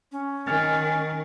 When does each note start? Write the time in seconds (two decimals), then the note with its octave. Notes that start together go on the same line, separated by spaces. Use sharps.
0.12 C#4
0.47 D#3 G#5 F6 A6